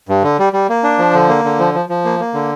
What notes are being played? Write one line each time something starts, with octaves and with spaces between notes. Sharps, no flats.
G2
D3
G3
G3
A#3
D4
F3
D3
A#3
D3
F3
F3
F3
A#3
A#3
D3